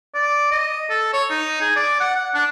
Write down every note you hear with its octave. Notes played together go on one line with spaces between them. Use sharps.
D5
D#5
A4
C#5
D#4
G#4
D5
F#5
F#5
D4